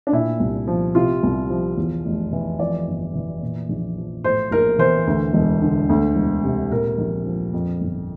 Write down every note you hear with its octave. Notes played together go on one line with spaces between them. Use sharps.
D4
A#2 E4
C2
F3
C3 F4
C2
F3
E2
F1
E3
F2 D5
G1
E3
A#2
A#1
F3
A2 C5
A#1 A#4
E3 C5
D2
E1
D3
D2
E1
C3
A#2 A#4
A#1
F3
F2
G1